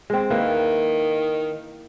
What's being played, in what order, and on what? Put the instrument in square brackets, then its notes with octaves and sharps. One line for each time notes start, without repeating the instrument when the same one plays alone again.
[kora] G#3 C4
[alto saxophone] D#3 [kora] A#3 E4 B4